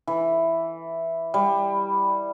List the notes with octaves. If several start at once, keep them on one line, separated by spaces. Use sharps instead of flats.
E3
G3